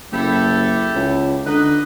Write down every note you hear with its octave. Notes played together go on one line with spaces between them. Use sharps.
F#1 E4 G4 A4
C#2
D3 D#4 B4 D#5